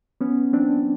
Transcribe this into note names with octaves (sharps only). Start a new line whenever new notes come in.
B3 C#4
C4 D4